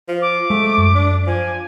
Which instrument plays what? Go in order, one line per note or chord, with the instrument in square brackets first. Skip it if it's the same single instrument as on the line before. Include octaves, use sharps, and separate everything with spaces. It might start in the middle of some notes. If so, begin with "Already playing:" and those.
[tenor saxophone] F3
[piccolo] D6
[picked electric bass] G#3 [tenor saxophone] A3
[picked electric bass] F#2
[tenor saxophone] D4
[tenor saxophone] F3 [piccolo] G#5